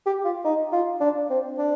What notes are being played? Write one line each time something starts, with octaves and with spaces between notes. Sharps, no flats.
G4
F4
D#4
F4
D4
C4
D4